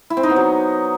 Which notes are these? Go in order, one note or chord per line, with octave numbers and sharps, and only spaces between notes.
E4
C4
D#4
B3
F#3